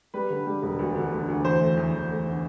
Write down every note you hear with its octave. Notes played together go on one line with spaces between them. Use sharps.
G3 B4
D3
G3
E1
D2
D3
D3
D2
E2 C5
A3
E2
E2
A3
D3